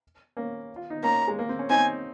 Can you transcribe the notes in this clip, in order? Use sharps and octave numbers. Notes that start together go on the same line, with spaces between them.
A#3 C#4
F4
D#4
A#3 C#4 A#5
G#3
A#3
C4
C#4
C4 D#4 G#5